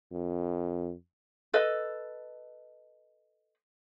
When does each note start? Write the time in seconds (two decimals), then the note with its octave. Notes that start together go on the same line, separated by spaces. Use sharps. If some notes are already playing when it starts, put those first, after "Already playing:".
0.12 F2
1.53 A4 B4 D#5